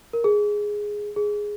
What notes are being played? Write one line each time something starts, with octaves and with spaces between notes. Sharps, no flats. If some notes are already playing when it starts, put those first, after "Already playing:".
A#4
G#4
G#4